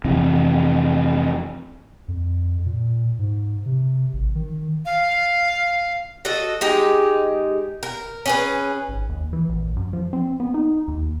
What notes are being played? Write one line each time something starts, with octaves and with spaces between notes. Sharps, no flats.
F2 C3 E3
F2
A#2
G#2
C3
G#1
D#3
F5
F#4 A4 D#5
G#3 D#4 G4
A#4
C#4 G#4 B4
G#1
D#2
E3
A#1
F#2
F3
C4
B3
D#4
D#2